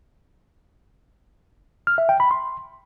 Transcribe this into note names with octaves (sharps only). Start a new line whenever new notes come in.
F6
E5
G5
B5
C6